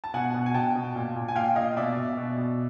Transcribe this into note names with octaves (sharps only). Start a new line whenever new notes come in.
A5
B2 F#5 G#5
B2
G#5
B2 G5 A5
B2
A#2
A#2
G#5
A#2 F5 G5
A#2 D#5 F5
B2 D5 E5
B2
B2
B2